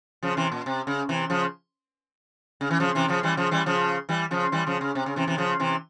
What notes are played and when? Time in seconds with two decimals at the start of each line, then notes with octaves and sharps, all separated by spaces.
0.23 C#3 F3
0.37 C3 E3
0.52 A#2
0.66 C3
0.87 C#3
1.09 C3 E3
1.30 C#3 F3
2.61 C#3
2.71 E3
2.80 C#3 F3
2.95 C3 E3
3.08 C#3 F3
3.23 E3 G3
3.37 C#3 F3
3.51 E3 G3
3.66 C#3 F3
4.09 E3 G3
4.31 C#3 F3
4.52 E3 G3
4.66 C#3 F3
4.81 C#3
4.95 C3
5.06 C#3
5.16 C3 E3
5.27 C3 E3
5.38 C#3 F3
5.60 C3 E3